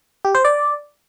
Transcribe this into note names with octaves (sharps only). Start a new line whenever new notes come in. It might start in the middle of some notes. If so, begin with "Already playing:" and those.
G4
C5
D5